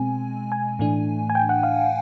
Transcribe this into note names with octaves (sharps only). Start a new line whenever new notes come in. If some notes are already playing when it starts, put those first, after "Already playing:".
Already playing: B2 G#3 C4 G#5
G#5
A2 E3 A3 D4
G#5
G5
F#5
F5